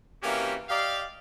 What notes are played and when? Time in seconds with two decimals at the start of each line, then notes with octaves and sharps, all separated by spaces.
0.23 C3 E3 A#3 C#4 F#4 G4
0.69 G4 D5 D#5 F5